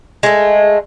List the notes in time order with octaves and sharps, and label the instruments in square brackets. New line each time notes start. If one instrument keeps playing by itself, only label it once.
[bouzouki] G#3 A3